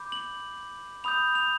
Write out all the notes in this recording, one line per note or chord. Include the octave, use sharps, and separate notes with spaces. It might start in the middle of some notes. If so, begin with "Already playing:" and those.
Already playing: B5 D6 G6
F#7
B5 D#6 G6 F7
F7